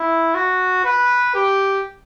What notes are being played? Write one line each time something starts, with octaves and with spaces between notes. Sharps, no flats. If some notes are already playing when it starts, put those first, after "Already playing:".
Already playing: E4
F#4
B4
G4